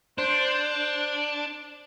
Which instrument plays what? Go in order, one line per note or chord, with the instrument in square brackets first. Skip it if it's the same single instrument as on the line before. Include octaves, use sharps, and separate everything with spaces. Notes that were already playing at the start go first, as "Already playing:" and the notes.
[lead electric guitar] D4 [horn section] C5